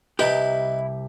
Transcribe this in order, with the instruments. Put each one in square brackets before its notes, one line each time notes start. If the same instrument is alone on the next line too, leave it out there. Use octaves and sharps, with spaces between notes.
[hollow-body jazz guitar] C2 G4 [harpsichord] D#4 B4 B5 [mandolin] E4